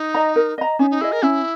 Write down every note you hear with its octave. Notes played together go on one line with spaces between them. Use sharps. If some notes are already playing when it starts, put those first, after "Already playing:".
Already playing: D#4
D#5 A#5
A#4
D#5 A#5
C#4 D#4
D#4
E4 G#4 D#5
A#4
C#4 E4